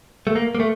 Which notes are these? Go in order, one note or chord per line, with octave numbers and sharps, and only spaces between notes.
A3
A#3
A#3
A3